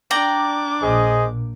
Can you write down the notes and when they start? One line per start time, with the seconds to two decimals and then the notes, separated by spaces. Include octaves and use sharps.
0.11 D4 D5 G5 A#5 D6
0.81 A#1 A#2 G#4 C5 D#5